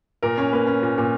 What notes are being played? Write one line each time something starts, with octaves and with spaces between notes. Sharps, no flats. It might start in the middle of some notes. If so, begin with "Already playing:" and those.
A#2 A#4
C#4
A#3 B4
C#4
A#2
A#2